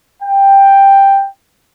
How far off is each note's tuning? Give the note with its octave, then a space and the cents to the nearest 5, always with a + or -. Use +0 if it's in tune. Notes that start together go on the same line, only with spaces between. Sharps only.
G5 +5